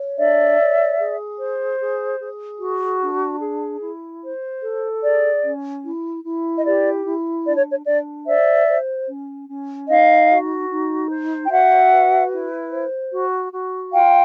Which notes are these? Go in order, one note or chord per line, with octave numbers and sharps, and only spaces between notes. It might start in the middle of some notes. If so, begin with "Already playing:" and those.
Already playing: C#5
D4 D5 E5
C#5
G#4
C5
G#4
G#4
F#4
D4
G#4
E4
C5
A4
G#4 D5
C#4
E4
E4
D#5
G4 D5
E4
D4 D5
C#5
C#5
D4 D5
C5 D5 E5
C5
C#4
C#4
D#4 D#5 F5
F#4
D#4
C5
G5
F#4 E5 F#5
B4
E4
C5
F#4
F#4
F4 F5 G5